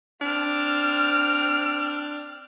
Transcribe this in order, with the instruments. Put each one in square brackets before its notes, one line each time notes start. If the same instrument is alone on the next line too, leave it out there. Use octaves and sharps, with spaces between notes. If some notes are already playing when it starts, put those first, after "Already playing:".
[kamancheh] C4 F6 [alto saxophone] D4